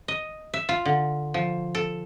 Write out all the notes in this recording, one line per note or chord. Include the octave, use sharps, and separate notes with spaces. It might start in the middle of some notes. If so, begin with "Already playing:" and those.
D#5
E5
F4
D3
F3
A4